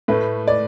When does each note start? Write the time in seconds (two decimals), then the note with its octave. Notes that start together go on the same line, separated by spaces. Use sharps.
0.08 A2 A3 B4
0.48 D5